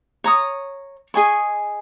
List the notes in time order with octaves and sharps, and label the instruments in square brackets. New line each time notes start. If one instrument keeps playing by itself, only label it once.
[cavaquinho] C#5 A#5 D#6
G#4 D#5 G#5 C#6